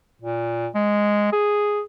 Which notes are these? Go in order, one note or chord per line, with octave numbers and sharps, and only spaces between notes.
A#2
G#3
G#4